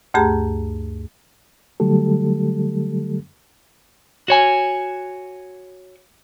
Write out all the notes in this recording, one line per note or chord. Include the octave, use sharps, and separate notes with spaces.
D2 G2 A3 G4 G#4 A#5
D3 F#3 G3 A3 G4 A4
F#4 C#5 G#5